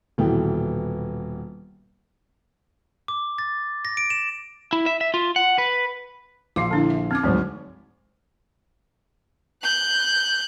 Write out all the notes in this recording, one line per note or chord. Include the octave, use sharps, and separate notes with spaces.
D#1 B2 E3 B3 G5
D6
A6
A#6
D7
E7
E4
E5
E5
F4
F#5
B4
A#1 F5 C6 D6 C7
D3 D4 E4
E5
C4 C#4 D6 F6
D2 G#2 F3 F#3 C4
F#6 G6